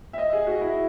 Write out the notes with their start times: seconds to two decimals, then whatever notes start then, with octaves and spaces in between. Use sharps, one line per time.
0.13 E5
0.18 D#5
0.33 G#4
0.47 F#4
0.61 E4